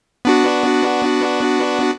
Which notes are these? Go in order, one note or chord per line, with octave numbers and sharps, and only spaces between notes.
B3 D4 F#4